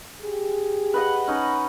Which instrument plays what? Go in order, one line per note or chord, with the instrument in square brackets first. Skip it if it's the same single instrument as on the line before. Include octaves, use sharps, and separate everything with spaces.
[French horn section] G4 G#4
[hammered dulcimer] B4 D#5 F#5
C#4 D#4 D#5